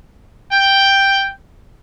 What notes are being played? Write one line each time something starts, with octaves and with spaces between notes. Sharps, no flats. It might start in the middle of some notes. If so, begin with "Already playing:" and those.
G5